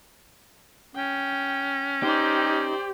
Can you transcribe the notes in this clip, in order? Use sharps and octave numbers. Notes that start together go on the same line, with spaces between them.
C#4 G5
D#4 G4 C5 D5